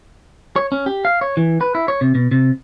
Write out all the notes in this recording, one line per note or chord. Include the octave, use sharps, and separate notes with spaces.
C#5
C#4
G4
F5
C#5
E3
B4
E4
C#5
C3
B2
C3